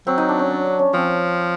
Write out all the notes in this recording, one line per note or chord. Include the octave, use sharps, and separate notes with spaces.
F#3 C4
D#4
D4
C#4
D4
D4
C#4
F3 C4